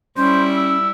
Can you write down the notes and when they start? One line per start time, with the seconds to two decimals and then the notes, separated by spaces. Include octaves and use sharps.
0.17 G3 C#4 E4 C5
0.57 E6